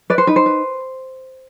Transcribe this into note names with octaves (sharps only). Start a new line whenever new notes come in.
B4 D5
C5
D#4 B4
C5
B4